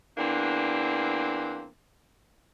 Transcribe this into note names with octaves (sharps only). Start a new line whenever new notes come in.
E2 A#3 C4 D4